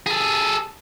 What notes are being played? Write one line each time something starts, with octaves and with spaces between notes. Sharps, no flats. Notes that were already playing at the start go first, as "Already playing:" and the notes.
G#4 A4